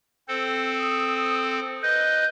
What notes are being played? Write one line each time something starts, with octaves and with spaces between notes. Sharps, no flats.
C4 A4 C5
D#6
B4 D#5 G6